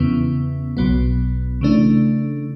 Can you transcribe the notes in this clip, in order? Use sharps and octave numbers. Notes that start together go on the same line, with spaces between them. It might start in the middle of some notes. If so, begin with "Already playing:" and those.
Already playing: E2 C#3 E3 B3
B1 B2 F#3 B3
C#3 E3 A3 D4